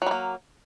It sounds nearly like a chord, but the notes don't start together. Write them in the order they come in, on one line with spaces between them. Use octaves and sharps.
F#3 G3 A#3